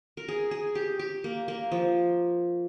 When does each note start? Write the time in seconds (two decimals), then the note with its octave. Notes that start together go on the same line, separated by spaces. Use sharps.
0.17 A#4
0.28 G#4
0.51 G#4
0.75 G4
0.99 G4
1.24 A#3
1.48 A#3
1.72 F3